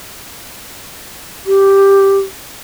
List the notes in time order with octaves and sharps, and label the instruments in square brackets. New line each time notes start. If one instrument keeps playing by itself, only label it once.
[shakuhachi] G4